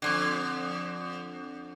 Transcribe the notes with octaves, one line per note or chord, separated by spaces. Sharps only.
F2 G#2 D3